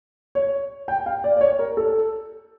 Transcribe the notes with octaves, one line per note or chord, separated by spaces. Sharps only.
C#5
G5
F5
D5
D5
C#5
A#4
A4